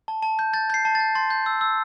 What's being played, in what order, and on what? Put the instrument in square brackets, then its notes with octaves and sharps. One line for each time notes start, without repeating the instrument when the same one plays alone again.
[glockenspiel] A5
A5
G6
G6 A6
G6 C7
A5
A6
G6
C6 A6
G6
E6
E6